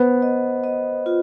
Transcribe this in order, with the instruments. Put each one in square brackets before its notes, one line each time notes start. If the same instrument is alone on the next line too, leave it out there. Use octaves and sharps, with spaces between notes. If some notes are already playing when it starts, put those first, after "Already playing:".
Already playing: [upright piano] B3 [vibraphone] C5
[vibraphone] D#5
D#5
F4